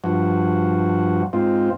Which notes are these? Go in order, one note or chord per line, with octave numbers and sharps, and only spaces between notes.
G2 F3 F#4
G#2 C4 F4